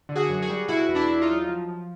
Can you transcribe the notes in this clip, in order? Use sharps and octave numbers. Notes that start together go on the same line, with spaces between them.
D3
F#4 G#4
F#2
F#4 G#4
G3
B2 E4 F#4
E2
D4 E4
E2
D#4 F4
F#3
F3
F3